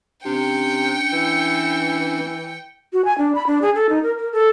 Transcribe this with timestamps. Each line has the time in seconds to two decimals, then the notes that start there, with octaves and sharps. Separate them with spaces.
0.25 C3 C#4 D4 G5 C#7
1.13 E3
2.93 F#4
3.05 G#5
3.18 D4
3.35 B5
3.47 D4
3.62 G#4
3.75 A4
3.89 D#4
4.03 A#4
4.18 A#4
4.33 A4